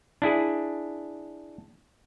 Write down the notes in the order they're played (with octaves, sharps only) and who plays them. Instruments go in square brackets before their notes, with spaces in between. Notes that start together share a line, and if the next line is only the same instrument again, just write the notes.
[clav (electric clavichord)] D4 E4 G#4